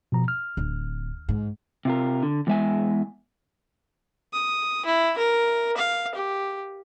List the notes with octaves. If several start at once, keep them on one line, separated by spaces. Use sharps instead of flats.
B2 F3 A#5
F6
D1
G#2
C3 F4 A#4
D3
E2 G#3 E5 G#5
D#6
E4
A#4
F5
G4